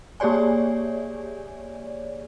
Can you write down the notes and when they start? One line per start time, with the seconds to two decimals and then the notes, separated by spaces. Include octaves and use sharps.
0.20 A#3 G4 G#4 C#5 D5 G#5